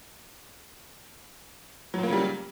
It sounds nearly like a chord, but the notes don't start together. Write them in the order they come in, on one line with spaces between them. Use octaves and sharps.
F#3 A#2 A#3 C#3 G3